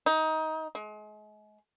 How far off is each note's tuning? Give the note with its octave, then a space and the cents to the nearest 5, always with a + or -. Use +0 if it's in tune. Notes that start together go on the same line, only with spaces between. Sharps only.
D#4 +20
G#3 +35